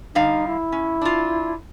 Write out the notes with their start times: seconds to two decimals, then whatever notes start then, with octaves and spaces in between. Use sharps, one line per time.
0.15 D3 G3 D#4 F5
0.47 E4
0.72 C#4
1.01 D4 F4